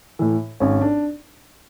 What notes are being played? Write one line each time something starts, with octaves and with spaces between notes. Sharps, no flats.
A2 E3
G#1 C#4
D4